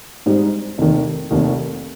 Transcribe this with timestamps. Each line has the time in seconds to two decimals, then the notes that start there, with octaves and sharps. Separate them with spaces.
0.26 G#2 G3 C4 D#4
0.78 F1 D#2 D#3
1.31 F1 D#2 D#3